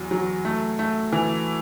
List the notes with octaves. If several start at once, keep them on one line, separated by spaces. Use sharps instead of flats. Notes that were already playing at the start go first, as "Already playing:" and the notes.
Already playing: E2 F#3
F#3
A3
A3
E3